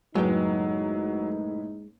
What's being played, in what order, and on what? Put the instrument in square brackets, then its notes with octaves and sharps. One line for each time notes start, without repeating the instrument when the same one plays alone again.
[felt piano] F#1 A2 B4 [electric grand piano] F#3 [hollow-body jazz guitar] G#3 G5 [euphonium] D#4